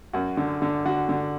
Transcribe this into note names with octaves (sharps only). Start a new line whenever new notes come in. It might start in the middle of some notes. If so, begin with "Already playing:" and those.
F#2 F#4
D3
D3
D3 F#4
D3